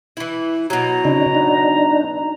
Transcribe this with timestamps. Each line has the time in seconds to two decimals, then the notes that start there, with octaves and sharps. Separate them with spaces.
0.17 E3 E4
0.70 B2 F#3 A#5
1.05 C#3 D4 D#4
1.35 D4 D#4